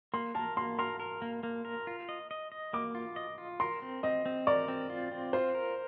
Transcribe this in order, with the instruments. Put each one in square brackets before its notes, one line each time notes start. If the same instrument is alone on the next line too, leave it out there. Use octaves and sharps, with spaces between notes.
[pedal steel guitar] A#3 [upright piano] C6
[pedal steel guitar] A#4 [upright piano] A5
[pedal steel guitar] A#3 [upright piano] C6
[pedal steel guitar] A#4 [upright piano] C6
[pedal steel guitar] A#4
A#3
A#3
A#4
F4
D#5
D#5
D#5
[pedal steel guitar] A#3 [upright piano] D6
[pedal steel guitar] F4
D#5
F4
[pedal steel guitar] A#4 [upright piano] C6
[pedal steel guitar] C4
[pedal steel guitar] C4 [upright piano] D#5
[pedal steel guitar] C4
[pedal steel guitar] A#4 [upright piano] D5
[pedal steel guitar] C4
F4
C4
[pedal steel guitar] F4 [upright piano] C5
[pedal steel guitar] A#4